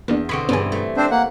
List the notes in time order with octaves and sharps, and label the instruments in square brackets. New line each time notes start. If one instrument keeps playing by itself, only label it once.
[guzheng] E2 [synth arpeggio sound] A#3 B3 D4
[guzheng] B2 D3 C4 [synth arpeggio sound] B5 C#6
[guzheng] G2 E3 [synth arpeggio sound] B3 C#4 G#4
[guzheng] A3
[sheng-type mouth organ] C4 D4 C5
A#3 F#5